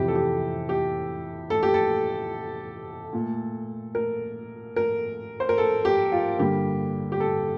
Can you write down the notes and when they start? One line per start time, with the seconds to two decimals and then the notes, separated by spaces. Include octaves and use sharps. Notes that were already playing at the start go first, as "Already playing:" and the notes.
Already playing: F2 C3 E3 G4
0.08 A4
0.15 G4
0.69 G4
1.50 A4
1.63 G4
1.74 A4
3.13 A#2 A3
3.95 A#4
4.76 A#4
5.40 C5
5.49 A#4
5.58 A4
5.85 G4
6.12 F4
6.39 G2 D3 G3 A#3 G4
7.12 G4
7.20 A4